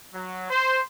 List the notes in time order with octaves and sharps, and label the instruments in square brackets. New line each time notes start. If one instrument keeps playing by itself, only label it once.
[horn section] F#3
C5